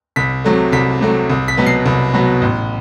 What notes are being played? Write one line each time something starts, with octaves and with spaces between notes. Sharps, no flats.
C2 B6
C3 F#3 A3
C2 B6
C3 F#3 A3
C2
B6
B2 F#3 B3
C7
C2
B2 F#3 B3
A1